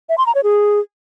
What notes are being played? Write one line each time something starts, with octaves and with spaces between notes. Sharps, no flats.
E5
C6
A#5
C#5
G#4